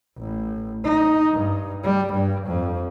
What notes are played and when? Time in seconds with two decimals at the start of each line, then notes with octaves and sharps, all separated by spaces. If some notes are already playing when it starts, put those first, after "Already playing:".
0.18 A1
0.84 D#4
1.32 G2
1.84 G3
2.14 G2
2.47 F2